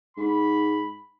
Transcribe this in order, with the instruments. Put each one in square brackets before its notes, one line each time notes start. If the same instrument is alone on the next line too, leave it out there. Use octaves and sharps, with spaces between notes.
[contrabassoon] G#2 [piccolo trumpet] B5